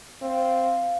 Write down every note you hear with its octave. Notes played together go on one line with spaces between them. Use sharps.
C4 F5